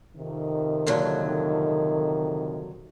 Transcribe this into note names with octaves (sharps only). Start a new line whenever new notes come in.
F2 C3 D#3
A#2 D3 F#3